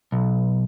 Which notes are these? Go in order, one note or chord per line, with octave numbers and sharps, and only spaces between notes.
B1